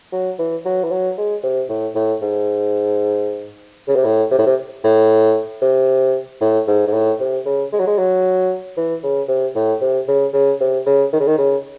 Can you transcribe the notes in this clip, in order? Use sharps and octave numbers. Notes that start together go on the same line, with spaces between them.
F#3
E3
F#3
E3
F#3
G#3
C3
A2
A2
G#2
C#3
C3
A2
C3
A2
C3
A2
C3
A2
G#2
G#2
A2
C3
C#3
G#3
F#3
G#3
F#3
E3
C#3
C3
A2
C3
C#3
C#3
C3
C#3
D#3
C#3
D#3
C#3